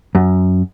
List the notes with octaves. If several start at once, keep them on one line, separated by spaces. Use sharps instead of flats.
F#2